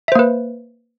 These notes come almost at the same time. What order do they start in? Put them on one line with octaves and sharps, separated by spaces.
E5 C5 A#3 B4